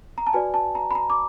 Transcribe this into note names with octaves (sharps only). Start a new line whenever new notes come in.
A#5
A5
F#4 B4 D5 G#5
A5
A#5
B5
A#5
D6